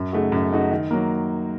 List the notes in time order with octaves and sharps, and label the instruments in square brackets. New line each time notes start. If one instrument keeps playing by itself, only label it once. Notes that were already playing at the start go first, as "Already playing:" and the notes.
Already playing: [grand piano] F#2
C#3 A3 D#4 F#4
F#2
C#3 A3 D#4 F#4
D#3
F#3 A#3